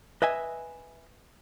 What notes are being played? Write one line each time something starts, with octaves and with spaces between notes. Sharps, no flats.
B4 D#5 E5 G#5